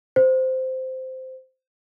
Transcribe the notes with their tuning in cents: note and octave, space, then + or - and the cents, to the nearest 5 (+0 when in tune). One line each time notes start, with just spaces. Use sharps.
C5 -10